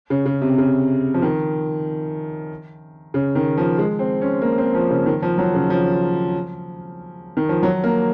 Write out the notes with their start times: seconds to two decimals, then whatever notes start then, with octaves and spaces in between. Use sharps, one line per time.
0.10 C#3
0.26 C#3
0.42 C3
0.58 C#3
1.14 F3
1.22 D#3
3.14 C#3
3.35 D#3
3.57 F3
3.79 G#3
3.99 C4
4.21 C#4
4.42 A#3
4.58 C4
4.75 F3
4.90 C#3
5.06 D#3
5.22 F3
5.38 F#3
5.54 C#3
5.70 F3
7.37 D#3
7.49 F3
7.63 F#3
7.84 A#3